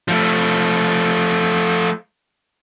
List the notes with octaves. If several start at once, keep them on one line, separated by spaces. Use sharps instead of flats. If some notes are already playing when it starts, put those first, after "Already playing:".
F3 A3